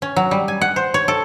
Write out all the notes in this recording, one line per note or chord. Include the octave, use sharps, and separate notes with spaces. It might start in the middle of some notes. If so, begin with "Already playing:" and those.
C#4
F#3
G3
G#5
F#5
C5
C#5
A4